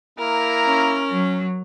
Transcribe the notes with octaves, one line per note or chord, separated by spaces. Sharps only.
A#3 E4 A#4 A#5
C#4
F#3